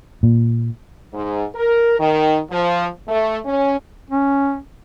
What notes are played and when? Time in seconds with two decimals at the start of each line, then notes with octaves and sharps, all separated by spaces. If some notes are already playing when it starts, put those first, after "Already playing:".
0.23 A#2
1.14 G#2
1.55 A#4
1.99 D#3
2.51 F3
3.08 A3
3.45 C#4
4.10 C#4